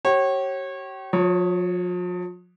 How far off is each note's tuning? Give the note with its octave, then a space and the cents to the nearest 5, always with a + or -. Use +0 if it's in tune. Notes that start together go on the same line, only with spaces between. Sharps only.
G4 -40 C#5 -30
F3 +40 C#5 +0